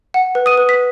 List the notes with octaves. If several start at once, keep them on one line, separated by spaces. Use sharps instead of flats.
F#5
B4
D#6 D#7
B4
B6